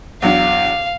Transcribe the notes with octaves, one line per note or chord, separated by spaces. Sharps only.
E2 F#3 D4 F5